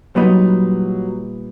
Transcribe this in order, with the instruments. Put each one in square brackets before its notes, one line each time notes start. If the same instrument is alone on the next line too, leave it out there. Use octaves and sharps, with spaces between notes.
[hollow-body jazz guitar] A#2 G3 B3 D#4 [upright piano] F#3